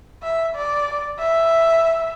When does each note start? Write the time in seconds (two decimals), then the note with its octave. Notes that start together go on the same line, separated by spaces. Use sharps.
0.23 E5
0.56 D5
1.20 E5